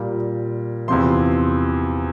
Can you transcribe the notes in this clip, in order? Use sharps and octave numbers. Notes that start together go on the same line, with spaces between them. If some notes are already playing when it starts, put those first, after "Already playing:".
Already playing: A#2 G3
E2 C3 F3 C6